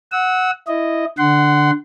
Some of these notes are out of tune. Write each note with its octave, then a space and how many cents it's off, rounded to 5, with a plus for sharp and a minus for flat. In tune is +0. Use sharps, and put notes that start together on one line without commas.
F#5 +0 E6 -30
E4 +0 D#5 -5
D3 +0 F#5 +15 C6 -20